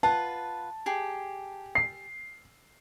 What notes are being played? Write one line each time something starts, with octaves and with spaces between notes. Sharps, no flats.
F4 B4 F#5 A5
G4 G#4
C7